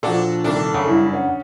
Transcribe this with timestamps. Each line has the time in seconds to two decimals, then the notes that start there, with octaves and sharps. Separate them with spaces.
0.03 A#2 F3 D4 F#4 A4
0.44 C2 D#3 D4 A4
0.74 F#2 C#3
0.88 G2 E4
1.13 C#4 F#5